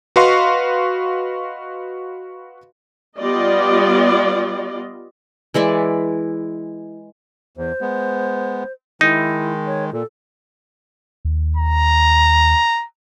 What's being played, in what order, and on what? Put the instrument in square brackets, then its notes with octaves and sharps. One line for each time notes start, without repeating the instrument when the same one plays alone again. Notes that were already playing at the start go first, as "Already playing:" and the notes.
[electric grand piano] F#4 B4 D#5 F5 C6 C#6
[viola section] G3 B3 F4 D5 D#5
[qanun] E3 G#3 E4 D5
[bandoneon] E2 [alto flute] C5
[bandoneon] G#3 B3
[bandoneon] D#3 G#3 [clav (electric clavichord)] D#4 [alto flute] E4
[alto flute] C#5
[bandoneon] A#2 [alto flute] A4
[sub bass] D#2
[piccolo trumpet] A#5